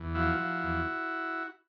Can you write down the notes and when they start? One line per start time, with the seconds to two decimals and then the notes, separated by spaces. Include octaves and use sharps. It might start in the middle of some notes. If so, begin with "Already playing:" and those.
Already playing: E2
0.15 F3 E4 F#4
0.38 F3
0.63 E2